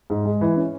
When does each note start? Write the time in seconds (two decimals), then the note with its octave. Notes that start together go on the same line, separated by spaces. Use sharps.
0.10 G#2
0.25 G#3
0.41 E3
0.57 C#4